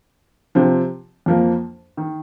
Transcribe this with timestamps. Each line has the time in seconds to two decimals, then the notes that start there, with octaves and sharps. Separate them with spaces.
0.55 C3 F3 C4
1.26 F2 F3 A#3
1.97 D#3